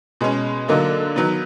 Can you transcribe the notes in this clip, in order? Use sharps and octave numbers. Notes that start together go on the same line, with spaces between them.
B2 G#3 C#4
D3 F#3 A#3 D#4
D#3 F#3 B3